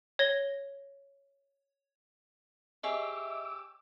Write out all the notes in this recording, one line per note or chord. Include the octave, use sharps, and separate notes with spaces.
C#5 G#6 A#6 G7
G4 G#4 C#5 D#5 E5 D6 E6